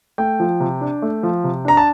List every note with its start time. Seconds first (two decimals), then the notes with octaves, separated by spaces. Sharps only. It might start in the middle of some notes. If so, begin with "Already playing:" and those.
0.18 A3 G5
0.40 F3
0.60 C3
0.81 D4
1.02 A3
1.23 F3
1.44 C3
1.65 D4 A#5
1.77 A5